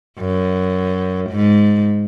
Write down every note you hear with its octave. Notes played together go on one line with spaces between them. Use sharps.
F#2
G#2